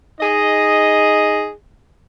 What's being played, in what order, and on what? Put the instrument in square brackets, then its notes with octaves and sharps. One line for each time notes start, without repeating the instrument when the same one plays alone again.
[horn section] D#4 G#4 D#5